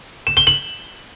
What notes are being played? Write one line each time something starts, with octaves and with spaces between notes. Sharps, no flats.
E7
G7
F#7